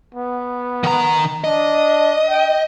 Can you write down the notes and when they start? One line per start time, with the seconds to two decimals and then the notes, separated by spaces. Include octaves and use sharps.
0.15 B3
0.84 D#3 A#5
1.44 D4 D#5
2.29 G5